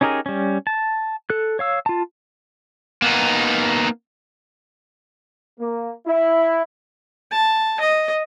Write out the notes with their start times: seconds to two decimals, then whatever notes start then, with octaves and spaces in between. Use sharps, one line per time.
0.01 C#4 D#4 G4 G#4 A#4
0.26 G3 C#4
0.67 A5
1.30 A4 F#6
1.59 C#5 F5 E6
1.86 F4 A5
3.02 A#3 B3 D#4
5.59 A#3
6.06 E4
7.32 A5
7.80 D#5